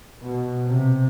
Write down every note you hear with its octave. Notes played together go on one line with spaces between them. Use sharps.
B2
C3